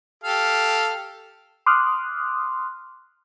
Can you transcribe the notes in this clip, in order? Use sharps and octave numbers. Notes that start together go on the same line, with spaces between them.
G4 A4 F5
C6 D6 D#6 F6 F#6